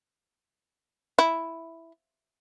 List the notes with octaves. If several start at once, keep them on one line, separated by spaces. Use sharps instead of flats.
E4